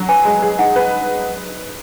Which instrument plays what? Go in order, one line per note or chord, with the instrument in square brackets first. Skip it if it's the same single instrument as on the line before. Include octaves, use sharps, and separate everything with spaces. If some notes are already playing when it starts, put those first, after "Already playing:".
Already playing: [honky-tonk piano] F#3
[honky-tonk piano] B4 [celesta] G#5
[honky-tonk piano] G#3
G#4
[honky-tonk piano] D#4 [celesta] F#5
[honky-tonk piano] B4